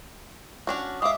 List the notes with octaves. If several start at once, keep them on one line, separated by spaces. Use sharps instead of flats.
C#4 D4 F#4
G#3 E5 F5 D6 D#6